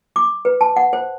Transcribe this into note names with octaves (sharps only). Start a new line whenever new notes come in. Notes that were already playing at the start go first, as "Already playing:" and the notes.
D6
B4
A5
F#5
C5